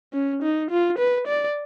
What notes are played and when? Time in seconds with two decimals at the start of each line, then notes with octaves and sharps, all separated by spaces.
0.14 C#4
0.42 D#4
0.71 F4
0.98 B4
1.27 D5